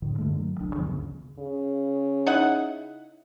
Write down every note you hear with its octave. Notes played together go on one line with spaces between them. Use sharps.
F2 A2 D3 D#3
G2 D3 G#3 A3
F#3
E1 C2 D4
D2 G2 F3 B3
D2 C#3
C#3
D#4 E4 F#5